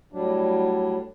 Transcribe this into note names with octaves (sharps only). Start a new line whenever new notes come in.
A2 F#3 G3 D4